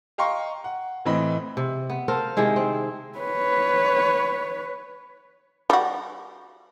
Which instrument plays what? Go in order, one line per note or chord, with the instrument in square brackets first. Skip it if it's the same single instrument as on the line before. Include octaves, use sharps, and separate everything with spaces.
[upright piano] D#5 F5 G5 A#5 C6 C#6
F#5
A2 E3 C4 D#5 B5
[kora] C3
B3
A4 A#4 C5 F5
C3 D#3 G#3 E4
C4
[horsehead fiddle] B4 C#5
[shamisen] G3 F#4